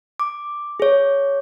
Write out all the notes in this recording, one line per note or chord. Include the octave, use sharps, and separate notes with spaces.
D6
G#4 C#5